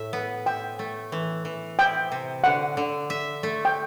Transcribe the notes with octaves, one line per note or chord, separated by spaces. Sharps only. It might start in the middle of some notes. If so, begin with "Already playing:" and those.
Already playing: A2 E5
B3
E5 G5
A3
E3
E3
E4 G5
C3
D3 F#5
D3
E5
A3
G5